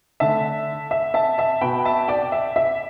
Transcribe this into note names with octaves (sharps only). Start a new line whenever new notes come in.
D3 A3 E5 A5
E5
E5 A5
E5 A5
B2 B3 G5 B5
E5 A5
D5 G5
E5
E5